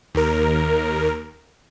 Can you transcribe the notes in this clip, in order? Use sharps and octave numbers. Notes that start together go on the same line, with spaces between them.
D#2 A#4